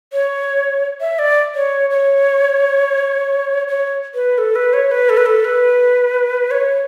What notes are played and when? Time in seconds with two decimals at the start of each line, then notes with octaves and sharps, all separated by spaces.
0.13 C#5
1.01 E5
1.19 D5
1.55 C#5
1.90 C#5
3.68 C#5
4.14 B4
4.38 A4
4.56 B4
4.73 C#5
4.91 B4
5.09 A4
5.17 B4
5.26 A4
5.45 B4
6.51 C#5